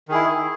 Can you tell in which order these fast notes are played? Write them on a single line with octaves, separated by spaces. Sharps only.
D#3 G#4 E4